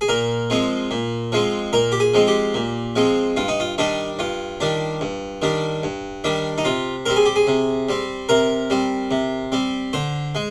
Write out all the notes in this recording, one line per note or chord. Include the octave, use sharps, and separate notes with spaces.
G#4
A#2 A#4
F3 G#3 C4
A#2
F3 G#3 C4
A#2 A#4
G4
G#4
F3 G#3 C4
G4
A#2
F3 G#3 C4
G2 F4
D#4
F4
D#3 G3 D4 D#4
G2 F4
D#3 G3 D4
G2
D#3 G3 D4
G2
D#3 G3 D4
D#4
C3 F4
G3 C4 A#4
G#4
G4
G#4
C3
G3 C4
C3 A#4
G3 C4
C3
G3 C4
D3 C5
G#3